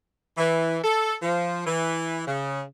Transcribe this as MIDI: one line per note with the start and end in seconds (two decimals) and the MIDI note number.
0.37 0.77 52
0.83 1.15 69
1.22 1.62 53
1.67 2.22 52
2.27 2.62 49